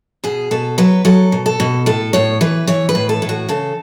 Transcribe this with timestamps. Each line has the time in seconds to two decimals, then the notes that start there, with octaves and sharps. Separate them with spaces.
0.24 B2 G#4
0.51 B2 A4
0.78 F#3 B4
1.05 F#3 A4
1.32 B2
1.46 A4
1.60 B2
1.86 A2 A4
2.13 A2 C#5
2.41 E3 B4
2.67 E3 C#5
2.89 B4
2.95 A2
3.09 A4
3.22 A2
3.29 F#4
3.49 C#3 A4